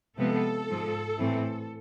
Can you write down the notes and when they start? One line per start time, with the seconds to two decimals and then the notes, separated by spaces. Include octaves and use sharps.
0.18 C3 F3 G#3 B3 A4
0.69 G#2 F3 G#3
1.19 A2 E3 A3 C4